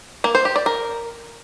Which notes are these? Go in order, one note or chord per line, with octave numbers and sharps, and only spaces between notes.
A#3
C5
G4
D5
A#4